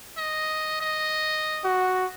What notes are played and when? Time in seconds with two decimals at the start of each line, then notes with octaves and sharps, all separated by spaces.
0.17 D#5
0.81 D#5
1.65 F#4